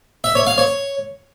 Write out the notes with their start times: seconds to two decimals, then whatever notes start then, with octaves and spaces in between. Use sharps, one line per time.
0.24 E5
0.35 C#5
0.47 F5
0.58 C#5